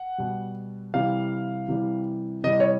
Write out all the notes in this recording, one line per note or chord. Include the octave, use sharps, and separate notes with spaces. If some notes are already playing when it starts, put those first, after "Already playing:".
Already playing: F#5
B2 G3
C3 E3 G3 F5
C3 E3 G3
C3 E3 G3 D#5
C#5